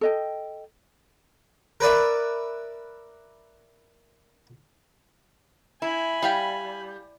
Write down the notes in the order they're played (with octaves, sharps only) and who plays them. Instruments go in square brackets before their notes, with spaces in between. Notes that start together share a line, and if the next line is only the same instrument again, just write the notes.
[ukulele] A4 D#5 G5
[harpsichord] A#4 B4 D5 E5
[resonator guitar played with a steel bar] E4 [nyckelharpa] G#5 B5
[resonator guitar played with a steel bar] G3 [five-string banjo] E4 F5 G5